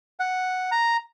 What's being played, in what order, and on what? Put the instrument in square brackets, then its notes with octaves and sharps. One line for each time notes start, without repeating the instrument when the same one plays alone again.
[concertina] F#5
A#5